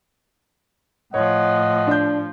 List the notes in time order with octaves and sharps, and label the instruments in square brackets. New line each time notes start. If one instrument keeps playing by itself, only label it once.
[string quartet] A2 F3 [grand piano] C#5 [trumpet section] D#5 F#5
[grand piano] D4 G6